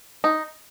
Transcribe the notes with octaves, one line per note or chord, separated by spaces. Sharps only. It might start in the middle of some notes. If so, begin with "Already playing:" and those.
D#4